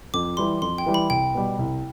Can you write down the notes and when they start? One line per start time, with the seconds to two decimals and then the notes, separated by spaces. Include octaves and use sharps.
0.14 F2 D6
0.37 E3 G3 C6
0.62 F2 C6
0.78 G5
0.86 E3 G3
0.94 B5
1.10 C2 G5
1.35 B2 G3
1.59 C2